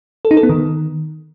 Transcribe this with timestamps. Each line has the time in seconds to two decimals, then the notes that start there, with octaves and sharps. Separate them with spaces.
0.25 A4
0.31 D#4
0.37 A4
0.43 B3
0.49 D#3